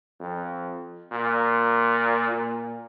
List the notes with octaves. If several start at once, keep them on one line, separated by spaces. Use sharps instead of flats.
F2
A#2
A#2